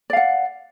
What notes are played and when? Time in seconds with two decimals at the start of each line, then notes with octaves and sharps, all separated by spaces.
0.10 D5
0.13 F5
0.17 F#5